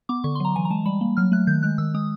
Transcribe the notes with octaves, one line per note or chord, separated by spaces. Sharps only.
B3 D6
D3 C#6
C6
F#3 A#5
E3 G#5
A#5
G#3 A5
G3 B5
A#3
F#3 F6
A3 F#6
D#3 G6
G#3 F#6
D#3 E6
G#3 D#6